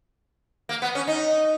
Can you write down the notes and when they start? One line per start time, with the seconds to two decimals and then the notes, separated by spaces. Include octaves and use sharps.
0.69 A#3
0.82 B3
0.95 C#4
1.08 D#4